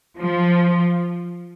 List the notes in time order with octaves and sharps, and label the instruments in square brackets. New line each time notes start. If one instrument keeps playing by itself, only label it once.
[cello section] F3